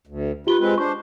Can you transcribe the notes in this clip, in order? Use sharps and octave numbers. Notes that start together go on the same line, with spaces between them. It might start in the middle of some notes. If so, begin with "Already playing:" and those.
D2
F4 G4 B4 G7
G#3 C4 B4
D4 C5 C#6